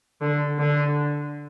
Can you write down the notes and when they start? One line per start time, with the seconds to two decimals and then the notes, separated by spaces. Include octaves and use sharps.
0.21 D3
0.58 D3